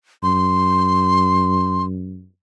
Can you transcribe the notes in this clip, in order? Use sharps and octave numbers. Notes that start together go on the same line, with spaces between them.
F#2 C6